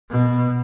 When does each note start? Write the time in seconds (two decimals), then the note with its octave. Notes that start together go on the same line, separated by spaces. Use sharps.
0.10 B2